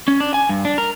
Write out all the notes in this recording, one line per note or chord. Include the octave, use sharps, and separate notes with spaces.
C#4
D4
G#5
G2
D4
A#4